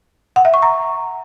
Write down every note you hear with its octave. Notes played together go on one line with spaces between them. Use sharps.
F#5
E5
C#6
A#5